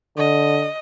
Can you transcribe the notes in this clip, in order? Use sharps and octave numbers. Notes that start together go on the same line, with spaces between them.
D3 D#5